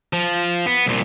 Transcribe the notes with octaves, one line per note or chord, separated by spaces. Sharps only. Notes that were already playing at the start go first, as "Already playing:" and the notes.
F3
B3
C2 A#2